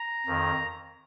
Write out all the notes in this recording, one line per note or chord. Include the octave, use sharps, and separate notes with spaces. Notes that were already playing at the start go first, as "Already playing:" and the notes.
Already playing: A#5
F2 D#3